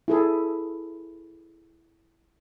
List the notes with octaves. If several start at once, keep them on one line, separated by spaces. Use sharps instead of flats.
E4 G#4 A4